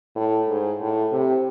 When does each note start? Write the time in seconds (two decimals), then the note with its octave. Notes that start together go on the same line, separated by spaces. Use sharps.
0.16 A2
0.49 G#2
0.81 A2
1.12 C3